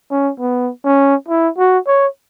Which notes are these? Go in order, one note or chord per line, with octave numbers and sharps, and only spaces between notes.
C#4
B3
C#4
E4
F#4
C#5